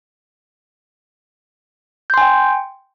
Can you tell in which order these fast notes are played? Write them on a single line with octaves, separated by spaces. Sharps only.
G6 C6 G#5 G5